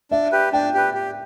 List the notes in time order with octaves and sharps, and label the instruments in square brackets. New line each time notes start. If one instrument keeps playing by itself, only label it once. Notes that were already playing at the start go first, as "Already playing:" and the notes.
[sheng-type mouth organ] D4 [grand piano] E5
[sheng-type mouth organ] G4 B4
[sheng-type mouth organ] D4 [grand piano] G5
[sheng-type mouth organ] G4 B4
G4